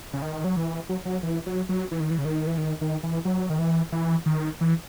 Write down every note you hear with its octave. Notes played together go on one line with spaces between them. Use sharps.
C#3
D#3
F#3
E3
F#3
F#3
E3
F#3
F#3
E3
D#3
E3
C#3
D#3
E3
D#3
D#3
E3
F#3
D#3
E3
E3
D#3
E3